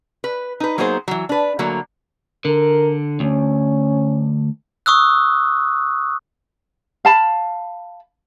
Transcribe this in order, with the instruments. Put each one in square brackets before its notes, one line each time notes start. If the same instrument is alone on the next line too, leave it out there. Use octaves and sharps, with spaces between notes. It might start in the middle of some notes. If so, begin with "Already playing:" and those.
[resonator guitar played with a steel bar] B4
D#4 B4
F#3 A#3 B3 D#4 G#4 C5
E3 F#3
D4 B4
D3 F#3 A3 A#3
[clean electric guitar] D3 [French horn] A#4
[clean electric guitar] D2 [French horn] C#4
[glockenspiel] C#6 D#6 E6 F#6
[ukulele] F5 A5 B5